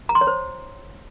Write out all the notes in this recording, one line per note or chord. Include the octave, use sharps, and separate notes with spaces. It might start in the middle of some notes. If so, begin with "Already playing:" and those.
A#5
C6
C#5
C5